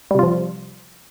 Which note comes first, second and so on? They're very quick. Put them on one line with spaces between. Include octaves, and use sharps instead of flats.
G3 C3 F4 F3